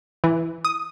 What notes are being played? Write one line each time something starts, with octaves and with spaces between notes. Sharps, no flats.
E3
D#6